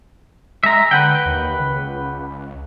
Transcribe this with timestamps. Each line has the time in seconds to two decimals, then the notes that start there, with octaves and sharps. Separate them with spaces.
0.64 G#3 E5 A#5
0.91 D3 B4 F#5 G5
1.25 D#2
1.59 C#2